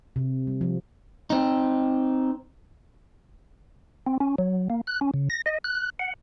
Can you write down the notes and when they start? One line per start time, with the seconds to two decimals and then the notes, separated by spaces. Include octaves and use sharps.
0.16 C3
0.47 G3
0.61 F3
1.30 C4 D#4
4.07 C4
4.20 C#4
4.38 F#3
4.70 A#3
4.87 F#6
5.01 C#4
5.14 C#3
5.30 A#6
5.46 D#5
5.64 F#6
5.99 F#5